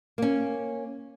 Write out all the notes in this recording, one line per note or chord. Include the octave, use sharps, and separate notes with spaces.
A#3 C#4